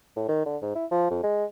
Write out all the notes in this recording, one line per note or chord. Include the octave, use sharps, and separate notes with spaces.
A2
D#3
D3
G#2
E4
F3
F2
G#3